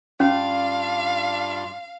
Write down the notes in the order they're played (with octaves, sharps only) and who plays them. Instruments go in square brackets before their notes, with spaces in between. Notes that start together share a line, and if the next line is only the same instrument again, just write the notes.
[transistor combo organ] G2 D4 F4 [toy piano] C#4 [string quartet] F5